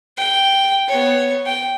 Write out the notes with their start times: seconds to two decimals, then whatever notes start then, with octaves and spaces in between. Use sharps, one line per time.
0.17 G5
0.88 B3 C#5
1.46 G5